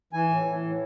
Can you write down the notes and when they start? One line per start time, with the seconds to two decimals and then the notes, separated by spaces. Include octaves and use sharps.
0.13 E3 G#5
0.29 A2
0.45 E3
0.62 A2